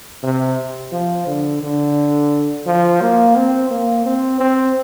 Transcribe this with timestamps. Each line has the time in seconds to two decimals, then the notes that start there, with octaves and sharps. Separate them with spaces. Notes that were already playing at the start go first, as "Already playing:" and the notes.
0.23 C3
0.92 F3
1.27 D3
1.62 D3
2.66 F3
3.01 A#3
3.36 C4
3.71 A#3
4.06 C4
4.40 C4